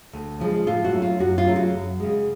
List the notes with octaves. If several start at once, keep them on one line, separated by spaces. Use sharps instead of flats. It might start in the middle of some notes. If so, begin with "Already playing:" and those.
D2
C#3 F3 G#3
A2 F4
F#4
F#3 A3 C#4
F4
F#2 F#4
F4
C#3 F#3 A3 C#4
F#4
F#2
C#3 G#3